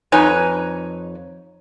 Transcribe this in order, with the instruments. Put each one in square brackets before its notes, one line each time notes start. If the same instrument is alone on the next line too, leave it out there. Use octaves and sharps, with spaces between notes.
[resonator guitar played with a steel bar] F2 D#4 B4 C#5 G#5